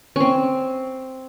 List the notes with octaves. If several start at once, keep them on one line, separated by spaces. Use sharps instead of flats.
C4 C#4